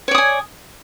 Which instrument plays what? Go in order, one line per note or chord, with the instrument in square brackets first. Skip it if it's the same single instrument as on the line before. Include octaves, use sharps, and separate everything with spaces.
[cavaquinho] C#5
D5
D#6
G#5